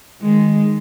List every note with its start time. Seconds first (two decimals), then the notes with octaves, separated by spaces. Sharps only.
0.21 D#3 G#3